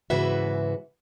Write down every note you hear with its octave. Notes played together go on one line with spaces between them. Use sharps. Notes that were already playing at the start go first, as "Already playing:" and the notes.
G#2 C#3 E3 F#4 B4 E5